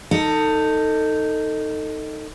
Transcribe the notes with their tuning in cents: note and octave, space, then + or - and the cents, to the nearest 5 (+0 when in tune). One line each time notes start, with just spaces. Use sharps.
D#4 +0 A4 +25